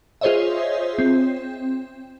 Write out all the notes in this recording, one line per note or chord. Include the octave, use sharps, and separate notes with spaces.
F4 G#4 C5 C#5 D#5 E5
C4